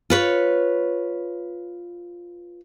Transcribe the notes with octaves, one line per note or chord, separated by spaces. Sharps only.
F4 B4 C#5